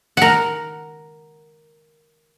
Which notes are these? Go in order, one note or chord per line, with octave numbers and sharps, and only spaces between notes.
A#4 F#5